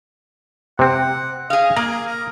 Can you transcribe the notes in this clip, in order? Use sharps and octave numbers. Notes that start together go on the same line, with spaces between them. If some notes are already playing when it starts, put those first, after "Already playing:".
C3 C4 F#5
G#4 D#5 F5
A#3 G#4 A#5
A#4